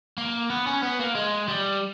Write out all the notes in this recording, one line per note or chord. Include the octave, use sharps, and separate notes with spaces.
A#3
B3
C#4
B3
A#3
G#3
G3